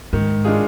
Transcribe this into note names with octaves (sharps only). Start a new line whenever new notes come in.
G#2 D#3
G#3 D4 F4 G#4